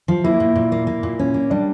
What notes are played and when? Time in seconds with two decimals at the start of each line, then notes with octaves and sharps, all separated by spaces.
0.08 F3
0.24 A#3 E4
0.40 A#2
0.56 A#2
0.72 A#3
0.87 A#3
1.03 A#2
1.19 C#4
1.34 A#3
1.50 G3 D4